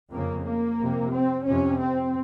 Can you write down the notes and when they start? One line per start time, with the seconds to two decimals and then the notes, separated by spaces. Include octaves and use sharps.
0.11 F2 C#3 A#3
0.45 A#3
0.79 F2 C3
1.13 C4
1.46 F2 C3 C#4
1.80 C4